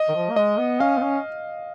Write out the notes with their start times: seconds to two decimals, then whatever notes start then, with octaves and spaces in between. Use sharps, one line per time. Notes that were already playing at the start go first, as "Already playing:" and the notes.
Already playing: D#5
0.08 D#3
0.15 F3
0.30 A#3
0.36 G#3 D#5
0.58 B3
0.80 C#4 F5
0.98 B3
1.02 C#4